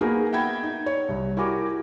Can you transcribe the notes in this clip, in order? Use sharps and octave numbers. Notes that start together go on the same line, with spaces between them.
A#3 B3 D#4 F#4 G#4 A#4
E5 F#5 G5 B5 G#6
D#4
C#5
C2
E4 F#4 G4 A#4 G#5 D6